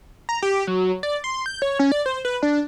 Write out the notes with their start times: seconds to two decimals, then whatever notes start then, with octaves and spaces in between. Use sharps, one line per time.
0.29 A#5
0.42 G4
0.67 F#3
1.03 D5
1.24 C6
1.46 G6
1.62 C#5
1.79 C#4
1.92 D5
2.06 C5
2.25 B4
2.43 D4